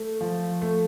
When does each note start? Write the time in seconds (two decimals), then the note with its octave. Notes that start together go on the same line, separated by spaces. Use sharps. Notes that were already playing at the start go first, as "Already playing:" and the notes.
Already playing: A3
0.21 F3
0.62 A3